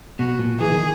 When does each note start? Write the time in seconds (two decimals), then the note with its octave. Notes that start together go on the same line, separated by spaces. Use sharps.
0.19 B2 F#4
0.39 A#2
0.60 E3 G#4
0.72 D#3